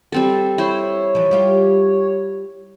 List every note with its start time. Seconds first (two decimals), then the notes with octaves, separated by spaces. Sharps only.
0.12 G3 C4 A4
0.58 E4 C5 C#5
1.15 E3 F3
1.31 G3 F4 G4